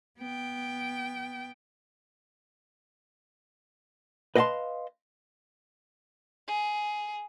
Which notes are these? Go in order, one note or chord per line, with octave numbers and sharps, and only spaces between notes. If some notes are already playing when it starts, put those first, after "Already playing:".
B3 G5
B4 D#5 F5 F#5 A5 C6
G#4